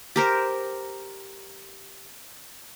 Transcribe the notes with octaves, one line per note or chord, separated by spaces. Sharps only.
G4 A#4 C5